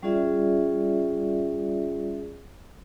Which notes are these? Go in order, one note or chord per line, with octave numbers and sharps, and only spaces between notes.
G3 C#4 F4 G#4 D5 E5